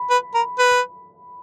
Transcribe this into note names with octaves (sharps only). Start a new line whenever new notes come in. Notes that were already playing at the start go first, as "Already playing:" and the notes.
Already playing: B5
B4
A#4
B4